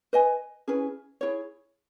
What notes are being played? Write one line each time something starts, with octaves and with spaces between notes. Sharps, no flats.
B4 D#5 G#5
C#4 E4 G#4 B4
E4 G#4 C#5